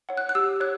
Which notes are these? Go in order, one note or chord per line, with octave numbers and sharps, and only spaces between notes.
C#5 F#5
F#6
F#6
G4 E6
C#5 F#6